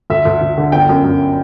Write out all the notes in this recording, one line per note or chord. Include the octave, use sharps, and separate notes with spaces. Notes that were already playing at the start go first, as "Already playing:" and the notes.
D2 E5
D2
D2
D3
G1 G5
F#2
F#2